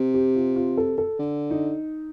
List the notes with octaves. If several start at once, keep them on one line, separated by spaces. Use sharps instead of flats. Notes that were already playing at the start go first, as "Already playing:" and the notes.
Already playing: C3
G4
F4
F4
A4
A4
D3
D#4